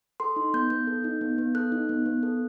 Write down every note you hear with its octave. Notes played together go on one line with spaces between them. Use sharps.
A4 C6
D#4
B3 G6
B3 G6
A4
D#4
B3
B3
A4 F#6
D#4
B3
B3
A4